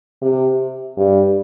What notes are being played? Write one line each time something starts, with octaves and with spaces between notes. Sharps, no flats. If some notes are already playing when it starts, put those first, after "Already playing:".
C3
G2